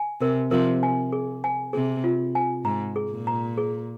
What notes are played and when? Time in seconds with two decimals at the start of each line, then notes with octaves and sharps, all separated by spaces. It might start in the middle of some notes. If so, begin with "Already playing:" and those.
Already playing: G#5
0.21 C3 A#4
0.51 C3 F3 A#4
0.83 G#5
1.13 G#4
1.44 G#5
1.73 C3 G#4
2.04 F4
2.35 G#5
2.65 G#2 A#5
2.96 G#4
3.11 A#2
3.27 A#5
3.58 G#4